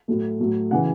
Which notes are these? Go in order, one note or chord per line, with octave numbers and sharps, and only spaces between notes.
A2 F#3 A3
A2 F#3 A3
C#3 E3 F#5